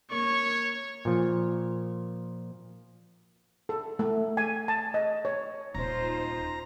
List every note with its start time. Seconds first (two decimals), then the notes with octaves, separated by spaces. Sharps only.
0.11 A#3 C#5 C#6
1.05 A#2 F3
3.69 A4
3.99 A3
4.37 G#5
4.68 A5
4.94 D#5
5.25 C#5
5.75 D#1 D#4 F4 C5 A#5